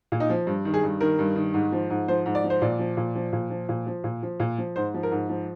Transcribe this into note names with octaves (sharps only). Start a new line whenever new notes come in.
A#2
D#4
F3
G2
D#3
G#4
G2
D#3 A#4
G2
D#3
G#2
F3
G#2
F3 C5
G#2
D5
F3
C5
A#2 D5
F3
A#2
F3
A#2
F3
A#2
F3
A#2
F3
A#2
F3
G#2 C5
F3
A#4
G#2
F3